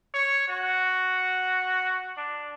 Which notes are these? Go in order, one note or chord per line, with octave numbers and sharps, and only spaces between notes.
C#5
F#4
D4